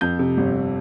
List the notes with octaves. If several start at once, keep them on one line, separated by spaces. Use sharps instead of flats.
F2 G6
C3
G1